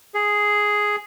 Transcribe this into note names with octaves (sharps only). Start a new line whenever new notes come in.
G#4